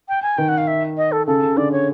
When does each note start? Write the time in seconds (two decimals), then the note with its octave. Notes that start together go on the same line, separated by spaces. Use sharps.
0.09 G5
0.23 G#5
0.38 D#3 G5
0.49 F#5
0.58 F5
0.67 E5
0.97 D#5
1.12 A4
1.27 C#3 A4
1.42 C#3
1.57 D3 D5
1.72 C#5